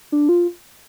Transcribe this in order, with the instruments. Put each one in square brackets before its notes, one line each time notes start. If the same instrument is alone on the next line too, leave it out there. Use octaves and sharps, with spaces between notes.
[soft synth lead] D4
F4